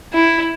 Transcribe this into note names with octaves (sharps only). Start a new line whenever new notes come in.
E4